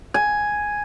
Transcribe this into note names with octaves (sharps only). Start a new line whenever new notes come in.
G#5